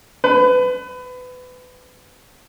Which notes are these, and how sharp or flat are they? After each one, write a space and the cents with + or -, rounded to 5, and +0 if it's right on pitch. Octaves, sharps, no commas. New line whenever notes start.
B4 +25